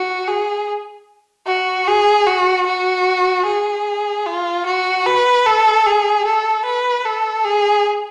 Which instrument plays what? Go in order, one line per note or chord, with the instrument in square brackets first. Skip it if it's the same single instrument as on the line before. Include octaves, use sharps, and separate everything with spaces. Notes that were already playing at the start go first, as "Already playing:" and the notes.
Already playing: [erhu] F#4
G#4
F#4
G#4
F#4
F#4
G#4
F4
F#4
B4
A4
G#4
A4
B4
A4
G#4